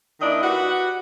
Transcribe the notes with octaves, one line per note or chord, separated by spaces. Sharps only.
D#3 A#3 D4 E4 D#5
F#4 G4 B4 F#5